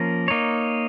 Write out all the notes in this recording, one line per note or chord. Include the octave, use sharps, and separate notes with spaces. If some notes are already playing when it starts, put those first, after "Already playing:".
Already playing: F3 A#3 C#4 A#4
A#3 D#4 C#5